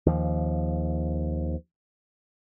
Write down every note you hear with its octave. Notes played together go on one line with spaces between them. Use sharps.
D#2 F3